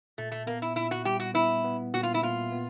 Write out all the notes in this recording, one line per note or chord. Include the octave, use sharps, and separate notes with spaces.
A#2 A3
A3
A#3 B3
E4
A#2 E4
F#4
G3 G4
F#4
B3 E4
B3
A#2 F#4
F4
E4
A#2 F4
B3